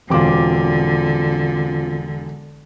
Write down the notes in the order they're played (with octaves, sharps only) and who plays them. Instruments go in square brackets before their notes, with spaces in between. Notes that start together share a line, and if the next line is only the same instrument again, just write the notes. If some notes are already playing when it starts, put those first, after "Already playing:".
[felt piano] E1 D6 [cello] D3 [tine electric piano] C4 F4